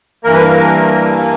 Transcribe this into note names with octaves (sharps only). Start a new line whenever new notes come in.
G2 E3 A#3 A#4
B4
A#4